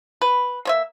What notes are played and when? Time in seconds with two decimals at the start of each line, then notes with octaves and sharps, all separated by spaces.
0.22 B4
0.65 A#3 C#5 E5